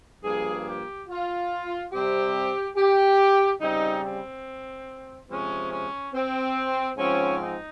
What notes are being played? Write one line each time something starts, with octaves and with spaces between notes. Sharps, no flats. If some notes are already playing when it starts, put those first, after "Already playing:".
G2 F3 A#3 G#4
G4
F4
C3 G3 C4 G4
G4
C#3 G3 C4 D#4
C4
C3 F3 G#3 C4 C#4
C#4
C4
G#2 F3 C4 C#4
D#4